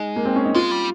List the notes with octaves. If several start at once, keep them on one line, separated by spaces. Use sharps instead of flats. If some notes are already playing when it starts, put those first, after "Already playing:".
Already playing: G#3 D#4
A#3
C4
C#4
D#4
G#3 F4
G3